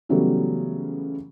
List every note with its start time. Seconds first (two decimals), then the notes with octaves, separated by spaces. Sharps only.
0.09 C#3 E3 F#3 G3 A3 B3